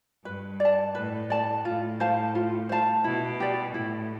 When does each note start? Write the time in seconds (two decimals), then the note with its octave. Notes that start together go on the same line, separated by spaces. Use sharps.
0.25 G2 B4
0.60 D5
0.65 A5
0.95 A2 B4
1.30 D5 A5
1.65 A2 F4
2.00 C5 F5 A5
2.35 F4
2.69 C5 F5 A5
3.04 B2 E4
3.40 G4 D5
3.74 A2 E4